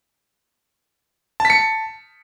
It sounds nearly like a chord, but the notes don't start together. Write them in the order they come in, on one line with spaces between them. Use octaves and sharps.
A5 B6 C#7